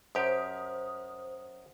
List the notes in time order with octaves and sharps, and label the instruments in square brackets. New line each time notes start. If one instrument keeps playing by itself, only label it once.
[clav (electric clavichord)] F#2 G4 [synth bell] C5 D#6